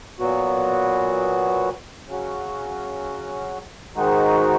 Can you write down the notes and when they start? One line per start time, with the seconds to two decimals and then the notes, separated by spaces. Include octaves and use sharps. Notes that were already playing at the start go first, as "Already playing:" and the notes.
0.19 A#2 F#3 B3 F#4
2.07 C#3 F#3 C#4 F#4
3.95 G#2 D#3 G#3 D#4 F#4